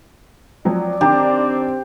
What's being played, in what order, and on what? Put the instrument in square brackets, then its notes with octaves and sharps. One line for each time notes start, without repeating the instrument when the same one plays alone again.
[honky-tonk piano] F3 F#3 C4 [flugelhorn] D5
[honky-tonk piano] D#3 D4 A#5 [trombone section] C4 [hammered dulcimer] G4